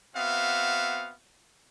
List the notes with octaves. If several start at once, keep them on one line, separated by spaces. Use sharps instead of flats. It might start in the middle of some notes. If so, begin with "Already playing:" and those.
B3 C4 F#4 E5 F5